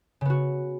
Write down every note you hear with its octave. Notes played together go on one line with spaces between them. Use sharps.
C#3 B3 F#4